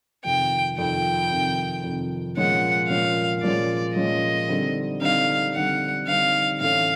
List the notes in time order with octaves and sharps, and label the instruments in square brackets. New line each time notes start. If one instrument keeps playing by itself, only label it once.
[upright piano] F2 C3 D#3 [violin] G5
[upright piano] F2 C3 D#3 [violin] G5
[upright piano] F2 C3 D#3
F2 C3 D#3
[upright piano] A#2 F3 G#3 C#4 [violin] F#5
[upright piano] A#2 F3 G#3 C#4 [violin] F5
[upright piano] A#2 F3 G#3 C#4 [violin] D5
[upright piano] A#2 F3 G#3 C#4 [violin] D#5
[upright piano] D3 G3 C4 D#4
[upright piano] D3 G3 C4 D#4 [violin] F5
[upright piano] D3 G3 C4 D#4 [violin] F#5
[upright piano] D3 G3 C4 D#4 [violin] F5
[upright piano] A2 E3 A3 C#4 [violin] F5